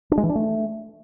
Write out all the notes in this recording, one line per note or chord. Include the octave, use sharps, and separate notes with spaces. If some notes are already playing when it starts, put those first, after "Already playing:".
D4
G#3
E3
D4
A3